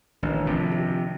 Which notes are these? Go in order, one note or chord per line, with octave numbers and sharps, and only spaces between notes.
A1 D#3 D4 G4
C3 F3
G4